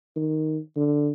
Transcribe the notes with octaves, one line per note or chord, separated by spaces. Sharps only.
D#3
D3